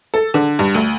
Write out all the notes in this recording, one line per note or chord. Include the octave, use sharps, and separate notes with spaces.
A4
D3
G2
D2